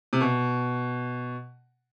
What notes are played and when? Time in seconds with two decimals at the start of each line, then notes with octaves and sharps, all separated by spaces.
0.13 C3
0.21 B2